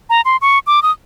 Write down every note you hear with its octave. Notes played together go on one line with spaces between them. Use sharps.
A#5
C6
C#6
D6
D#6